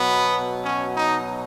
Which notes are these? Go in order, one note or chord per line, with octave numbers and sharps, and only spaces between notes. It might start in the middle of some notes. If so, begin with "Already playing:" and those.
Already playing: B2 F#3 B3
C#4
D#4